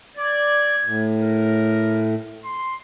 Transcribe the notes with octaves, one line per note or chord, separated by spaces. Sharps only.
D5 G#6
A2
A#4
C6